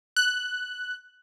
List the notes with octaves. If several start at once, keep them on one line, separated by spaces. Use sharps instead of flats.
F#6